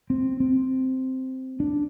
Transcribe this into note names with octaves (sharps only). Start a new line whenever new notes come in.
C4
C4
D4